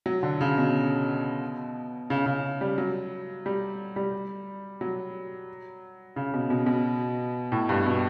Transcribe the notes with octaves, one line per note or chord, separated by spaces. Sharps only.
F#3
D3
C#3
B2
C#3
C#3
G3
F#3
G3
G3
F#3
C#3
B2
B2
B2
A2
G2
B2